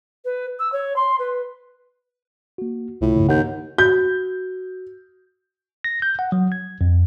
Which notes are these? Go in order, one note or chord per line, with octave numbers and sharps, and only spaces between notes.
B4
E6
C#5
C6
B4
A#3 F#4
C2 A2 C3 F4
G2 C#3
D#2 F#5 G6
F#4 G6
A#6
G6
F#5
F#3
G#6
F2